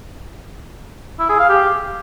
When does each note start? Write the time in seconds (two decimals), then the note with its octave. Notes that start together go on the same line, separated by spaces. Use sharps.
1.19 E4
1.29 G#4
1.39 F5
1.49 G4